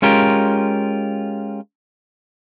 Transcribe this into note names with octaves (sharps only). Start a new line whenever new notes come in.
G#3 C#4 F4 G4 A#4